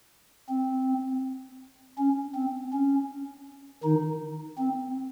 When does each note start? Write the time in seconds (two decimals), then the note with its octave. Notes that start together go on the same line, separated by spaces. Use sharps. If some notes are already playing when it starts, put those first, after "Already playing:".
0.49 C4
1.98 C#4
2.35 C4
2.73 C#4
3.84 D#3 D#4
4.58 C4